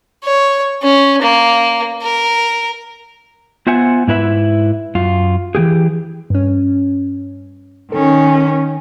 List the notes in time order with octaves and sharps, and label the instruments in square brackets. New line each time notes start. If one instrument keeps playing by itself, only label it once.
[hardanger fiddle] C#5
C#4
A#3
A#4
[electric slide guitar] B3 F4 C5 E5 F#5 G#5
G#2 E4 B4 E5
F#2 F4
E3 G3 G4 G#4
[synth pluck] G2 C#4
[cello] D#3 C#4 [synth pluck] A4